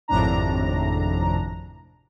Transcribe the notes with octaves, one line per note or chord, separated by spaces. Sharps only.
G#1 F2 A2 C3 D4 A#5